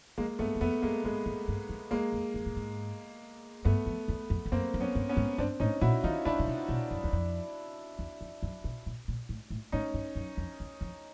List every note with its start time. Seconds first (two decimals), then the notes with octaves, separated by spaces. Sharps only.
0.18 F2 G#3 A#3
0.39 G2 A3 B3
0.55 E2
0.61 F2 A3 B3
0.82 G2 G#3 A#3
1.04 G#2 G#3
1.26 G#2
1.48 G2
1.69 F2
1.91 E2 G#3 A#3
2.13 F2
2.34 F#2
2.46 A2
2.56 G#2
3.65 G2 A3 B3
3.86 F2
4.08 E2
4.30 F2
4.46 F2
4.52 F#2 A#3 C4
4.74 F#2
4.80 B3 C#4
4.95 G2
5.09 B3 C#4
5.17 G#2
5.38 G2 C4 D4
5.60 A2 C#4 D#4
5.81 A#2 E4 F#4
6.03 D#3 D#4 F4
6.25 D3 D4 E4
6.39 B2
6.47 C3
6.69 B2
6.91 F#2
7.04 E2
7.13 F2
7.99 E2
8.21 F2
8.43 F#2
8.64 B2
8.86 A#2
9.08 A#2
9.29 A2
9.50 A2
9.72 A2 C#4 D#4
9.94 G2
10.15 F#2
10.37 F2
10.60 E2
10.81 F2